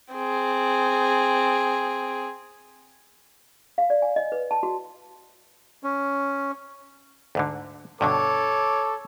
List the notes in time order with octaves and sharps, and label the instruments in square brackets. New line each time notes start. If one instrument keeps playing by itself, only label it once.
[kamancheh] C4 G#4
[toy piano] F5
D5
G#5
D#5
B4
A5
F#4
[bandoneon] C#4
[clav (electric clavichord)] D2 G#2 D3
[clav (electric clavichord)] G2 B2 D3 [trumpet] A4 [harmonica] C#5 D6